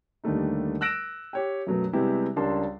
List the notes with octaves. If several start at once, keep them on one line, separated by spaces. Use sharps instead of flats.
D#2 D3 G3 A3 D#4
E6 F#6 A#6 D7 E7
G4 C#5 G5
F#2 B2 F#3 A3 B3
C3 G3 G#3 B3 E4 G4
C#2 G3 D4 A#4 A5 C6